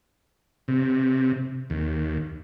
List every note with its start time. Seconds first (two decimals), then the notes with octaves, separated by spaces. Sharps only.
0.68 C3
1.70 D#2